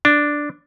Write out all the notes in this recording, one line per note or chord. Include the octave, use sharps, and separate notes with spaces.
D4